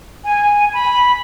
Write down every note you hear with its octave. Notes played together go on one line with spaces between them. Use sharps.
G#5
B5